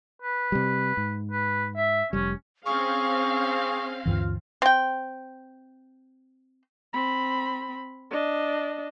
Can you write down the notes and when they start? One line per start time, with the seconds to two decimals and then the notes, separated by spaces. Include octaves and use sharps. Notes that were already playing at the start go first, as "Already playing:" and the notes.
0.22 B4
0.52 C3 G3
0.97 G#2
1.31 B4
1.77 E5
2.13 F1 G3 C#4
2.66 C4 C#4 G#4 F5 C#6
4.05 D2 G2 E3 F4
4.62 C4 G5
6.93 C4 B5
8.11 D4 D#5